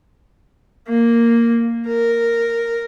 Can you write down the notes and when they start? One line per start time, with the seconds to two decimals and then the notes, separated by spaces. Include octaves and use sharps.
0.88 A#3
1.88 A#4